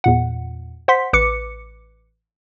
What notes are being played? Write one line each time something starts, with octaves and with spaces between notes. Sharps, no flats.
E2 A#2 F#5
C5 F#5 C6 B6
A1 B4 D6 C#7